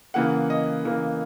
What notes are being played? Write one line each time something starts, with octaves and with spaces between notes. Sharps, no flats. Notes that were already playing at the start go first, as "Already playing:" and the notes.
C#3 E3 A#3 F#5
D#5
C#3 E3 A#3